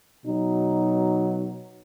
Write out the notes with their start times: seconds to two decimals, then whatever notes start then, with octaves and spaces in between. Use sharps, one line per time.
0.23 B2 F#3 D#4